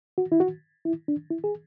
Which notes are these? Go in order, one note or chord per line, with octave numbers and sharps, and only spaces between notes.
F#4
E4
F#4
E4
D4
E4
G#4